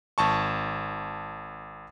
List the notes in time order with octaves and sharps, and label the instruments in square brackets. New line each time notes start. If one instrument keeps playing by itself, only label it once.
[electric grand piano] G#1 A5 C#6